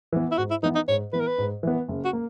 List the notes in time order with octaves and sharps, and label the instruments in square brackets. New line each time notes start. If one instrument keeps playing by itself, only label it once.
[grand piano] E3 B3
[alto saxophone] E4
[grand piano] G#2 [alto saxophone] F#4
[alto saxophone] E4
[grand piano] E3 B3 [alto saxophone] D#4
[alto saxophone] D#4
[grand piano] G#2 [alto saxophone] C#5
[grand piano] E3 B3 [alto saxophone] B4
[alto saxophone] A#4
B4
[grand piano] G#2
E3 B3
F#1
[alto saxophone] F#4
[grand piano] A#3